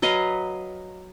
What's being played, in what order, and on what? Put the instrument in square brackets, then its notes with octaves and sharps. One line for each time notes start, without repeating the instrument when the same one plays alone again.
[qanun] F#3 B4 D#5 F5